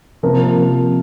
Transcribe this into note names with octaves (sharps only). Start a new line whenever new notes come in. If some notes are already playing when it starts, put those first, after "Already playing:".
C3 F3 A#3 A#4
C3 F3 A#3